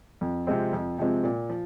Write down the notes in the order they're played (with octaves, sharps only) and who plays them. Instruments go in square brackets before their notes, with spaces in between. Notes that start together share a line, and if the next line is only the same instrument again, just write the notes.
[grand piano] F2
C3 F3 G#3 C4
F2
C3 F3 G#3 C4
A#2
F3